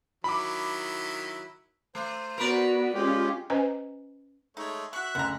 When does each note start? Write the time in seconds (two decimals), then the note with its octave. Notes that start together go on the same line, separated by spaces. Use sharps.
0.24 D#3 F#3 E4 B5 D6
1.95 A3 C5
2.38 B3 F#4 A#4 B4 D5
2.94 G#3 C#4 F4 G4
3.50 C#4 B4 C5 D#5 G#5 A#5
4.57 G#3 A3 D#4 C#5
4.93 F#4 E5 C#6 F#6
5.15 F#1 D2 F#5 A#5